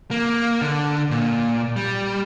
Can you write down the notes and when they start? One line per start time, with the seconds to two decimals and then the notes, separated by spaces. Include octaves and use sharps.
0.11 A#3
0.61 D3
1.11 A#2
1.76 G3